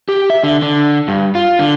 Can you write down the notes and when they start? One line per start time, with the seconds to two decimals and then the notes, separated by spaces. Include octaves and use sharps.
0.09 G4
0.30 E5
0.44 D3
0.62 D3
1.08 G2
1.35 F4
1.59 D3